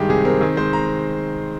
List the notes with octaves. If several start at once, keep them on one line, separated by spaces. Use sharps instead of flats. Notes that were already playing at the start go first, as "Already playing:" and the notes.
Already playing: G2 D#3 G#3 G4
C3 G#4
C4 A#4
D#3 G#4
G#3 C5
A#5